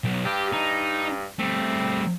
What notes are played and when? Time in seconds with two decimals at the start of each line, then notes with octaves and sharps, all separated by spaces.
0.04 B1
0.25 G2 G4
0.53 D#4
1.39 G3 A3 C4